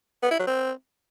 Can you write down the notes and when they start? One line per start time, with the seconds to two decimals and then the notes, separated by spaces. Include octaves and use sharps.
0.23 B3
0.31 E4
0.39 F#3
0.47 C4